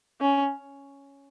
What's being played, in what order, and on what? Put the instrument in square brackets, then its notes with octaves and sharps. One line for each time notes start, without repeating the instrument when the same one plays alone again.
[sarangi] C#4